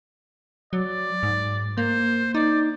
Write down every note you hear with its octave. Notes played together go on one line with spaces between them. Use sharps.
F#3 D5
G#2
A#3 C5
D#4 D5